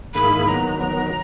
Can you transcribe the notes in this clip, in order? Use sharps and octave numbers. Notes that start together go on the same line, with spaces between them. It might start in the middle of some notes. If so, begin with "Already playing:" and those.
G#2 D#3 A#3 E4 G#4 B5
D#3 F#3 B3 A#5
D#3 F#3 B3 A#5